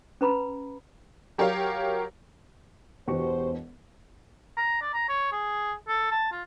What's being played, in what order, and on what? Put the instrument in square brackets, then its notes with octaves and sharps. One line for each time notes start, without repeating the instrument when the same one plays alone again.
[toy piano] C#4 B4 A#5 B5
[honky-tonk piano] F#3 G4 A#4 C#5 F5
[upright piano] E1 B2 [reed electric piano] F#4 G4 C#6 [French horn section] C5
[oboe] A#5
D5
A#5
C#5
G#4
A4
A5
F4